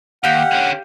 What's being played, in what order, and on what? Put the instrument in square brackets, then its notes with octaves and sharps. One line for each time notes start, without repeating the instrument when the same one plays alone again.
[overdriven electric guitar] D#2 [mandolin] G4 F5 [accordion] F#5
[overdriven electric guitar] D3 C#4